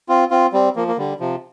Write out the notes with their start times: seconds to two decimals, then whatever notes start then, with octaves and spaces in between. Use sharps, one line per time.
0.09 C4 F4
0.31 C4 F4
0.53 G3 C4
0.76 F3 A#3
0.88 A#3
0.98 D3 G3
1.20 C3 F3